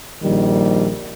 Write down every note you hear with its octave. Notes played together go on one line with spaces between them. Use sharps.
A#1 D#3 G3